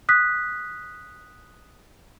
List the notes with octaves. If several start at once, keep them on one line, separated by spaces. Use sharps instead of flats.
D#6 F#6 B6